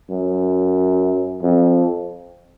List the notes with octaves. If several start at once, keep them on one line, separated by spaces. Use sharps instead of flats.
F#2
F2